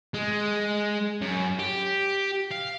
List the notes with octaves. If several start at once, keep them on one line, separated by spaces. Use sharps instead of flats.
G#3
F#2
G4
F5